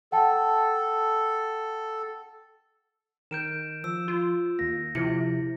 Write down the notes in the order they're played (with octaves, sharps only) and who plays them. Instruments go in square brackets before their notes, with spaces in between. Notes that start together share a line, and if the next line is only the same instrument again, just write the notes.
[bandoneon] A4 [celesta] F#5 G5 A5
[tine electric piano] D#3 A#4 [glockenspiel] G6 D7 E7
[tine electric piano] F3 [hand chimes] E6
[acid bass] F4
[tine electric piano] D#2 A#3 [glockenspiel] A#6
[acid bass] C3 [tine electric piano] F3 C#7 [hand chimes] E4